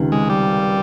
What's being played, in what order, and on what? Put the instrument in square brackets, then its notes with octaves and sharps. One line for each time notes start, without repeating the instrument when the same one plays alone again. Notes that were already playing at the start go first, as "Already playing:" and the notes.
Already playing: [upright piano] C#2 C3 D#3
[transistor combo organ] G#3
G3